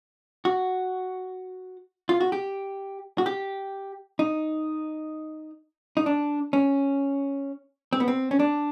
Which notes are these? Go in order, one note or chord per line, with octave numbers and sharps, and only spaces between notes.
F#4
F4
F#4
G4
F#4
G4
D#4
D#4
D4
C#4
C4
B3
C4
C#4
D4